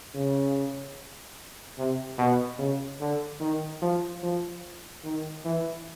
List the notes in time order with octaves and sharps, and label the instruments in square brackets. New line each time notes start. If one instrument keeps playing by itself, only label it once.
[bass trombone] C#3
C3
B2
C#3
D3
D#3
F3
F3
D#3
E3